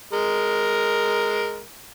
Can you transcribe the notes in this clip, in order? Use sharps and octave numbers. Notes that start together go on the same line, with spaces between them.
G#3 A#4